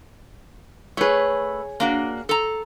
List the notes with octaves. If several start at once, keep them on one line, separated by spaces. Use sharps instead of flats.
A3 G#4 B4 C#5
A#3 D4 F#4
A4 A#5